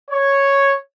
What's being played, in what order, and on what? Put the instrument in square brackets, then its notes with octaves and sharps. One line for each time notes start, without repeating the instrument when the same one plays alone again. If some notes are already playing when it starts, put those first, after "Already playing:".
[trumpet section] C#5